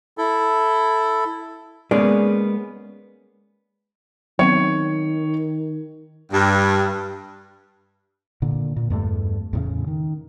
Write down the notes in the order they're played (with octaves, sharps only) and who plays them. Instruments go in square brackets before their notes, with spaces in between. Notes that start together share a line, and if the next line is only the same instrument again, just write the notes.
[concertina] E4 A4
[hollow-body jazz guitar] G#3 A#3 B3 C#4 G#4 D5
[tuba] D#3 [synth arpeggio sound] F#3 B3 C4 [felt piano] C#5
[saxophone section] G2
[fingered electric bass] A#2 D3
A#2
E2 G2 A3
E2 A2 C#3
D#3